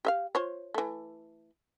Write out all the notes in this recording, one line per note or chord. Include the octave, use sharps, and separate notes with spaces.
G4 E5 F5
F4 C5 C#5
E3 A3